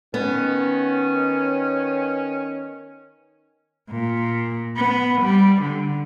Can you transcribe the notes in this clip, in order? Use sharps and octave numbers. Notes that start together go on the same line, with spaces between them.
D#3 B3 C#4
A#2
B3
G3
D3